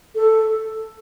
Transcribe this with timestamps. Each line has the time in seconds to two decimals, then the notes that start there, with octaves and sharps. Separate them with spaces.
0.15 A4